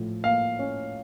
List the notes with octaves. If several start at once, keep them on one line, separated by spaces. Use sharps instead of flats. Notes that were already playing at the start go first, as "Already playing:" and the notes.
Already playing: A2 F3
A#3 F5
C#4